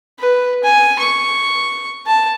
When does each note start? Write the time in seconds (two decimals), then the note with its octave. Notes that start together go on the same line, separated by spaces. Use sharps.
0.19 B4
0.64 G#5
0.99 C#6
2.06 A5